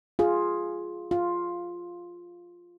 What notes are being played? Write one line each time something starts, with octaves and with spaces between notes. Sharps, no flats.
F4 G#4
F4